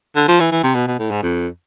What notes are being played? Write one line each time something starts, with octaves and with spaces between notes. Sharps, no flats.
D3
F3
E3
E3
C3
B2
B2
A2
G#2
F2